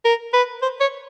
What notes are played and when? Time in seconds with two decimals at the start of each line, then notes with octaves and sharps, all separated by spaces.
0.05 A#4
0.33 B4
0.62 C5
0.80 C#5